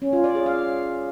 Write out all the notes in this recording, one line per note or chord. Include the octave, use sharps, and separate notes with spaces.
C#4
F4
D5
G#4
F5